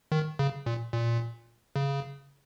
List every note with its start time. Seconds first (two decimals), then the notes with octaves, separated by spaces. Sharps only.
0.12 D#3
0.39 C#3
0.66 A#2
0.94 A#2
1.76 C#3